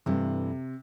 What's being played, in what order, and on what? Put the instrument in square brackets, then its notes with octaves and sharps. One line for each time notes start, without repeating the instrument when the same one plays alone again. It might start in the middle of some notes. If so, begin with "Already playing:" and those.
[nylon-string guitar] G2 E3 A3 [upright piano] C3